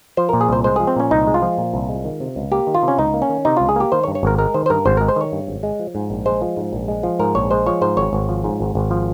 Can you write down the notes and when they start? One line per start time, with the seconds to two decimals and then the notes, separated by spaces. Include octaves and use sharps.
0.17 F3 C5
0.29 A#2 A#4
0.41 G#4
0.48 C2 C5
0.64 G#3 C5
0.76 F3 G#4
0.87 C4
0.96 A#2 C#4
1.11 C2 D#4
1.27 G#3
1.34 F4
1.42 F3
1.58 A#2
1.74 C2
1.89 G#3
2.05 D#3
2.20 C3
2.36 C#2
2.51 A#3 G4
2.67 D#3
2.74 F4
2.83 C3
2.88 C#4
2.98 C#2 D#4
3.14 A#3
3.22 C#4
3.30 D#3
3.45 C3 D#4
3.57 C#2 F4
3.69 G#4
3.76 A#3 G4
3.92 D#3 C5
4.04 C#5
4.08 G2
4.15 C#5
4.23 G#1 A#4
4.38 G#3 A#4
4.54 D#3 C5
4.66 C5
4.70 G2 A#4
4.85 G#1 C5
4.97 G#3 A#4
5.08 C5
5.16 D#3 C#5
5.32 G2
5.48 G#1
5.63 G#3
5.80 F3
5.95 G#2
6.10 A#1
6.26 G#3 C5
6.42 F3
6.57 G#2
6.73 A#1
6.88 G#3
7.03 F3
7.19 G#2 A#4
7.35 A#1 C#5
7.51 G#3 C5
7.66 F3 C#5
7.81 G#2 C5
7.97 G#1 C#5
8.13 G#1
8.29 F3
8.44 G#2
8.60 G#1
8.75 G#1
8.91 F3